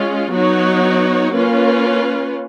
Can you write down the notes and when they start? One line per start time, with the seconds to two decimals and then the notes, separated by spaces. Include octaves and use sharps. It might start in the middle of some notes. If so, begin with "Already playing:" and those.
Already playing: G#3 C#4 F4
0.32 F#3 B3 D#4 F#4 C#5
1.34 A#3 C#4 F4 B4